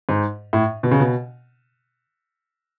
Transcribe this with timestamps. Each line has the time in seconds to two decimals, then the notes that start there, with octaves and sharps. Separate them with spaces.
0.09 G#2
0.53 A2
0.83 B2
0.91 C#3
1.00 B2